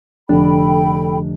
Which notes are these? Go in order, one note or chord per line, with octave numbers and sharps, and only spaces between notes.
F1 D3 D4 A4 G5 B5